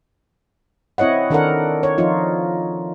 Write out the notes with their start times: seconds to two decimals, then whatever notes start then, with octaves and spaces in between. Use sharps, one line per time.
0.98 C4 E4 C#5 D#5 F#5
1.30 D#3 D4 A4 A#4 C#5 F#5
1.83 C#5
1.98 F3 D#4 F4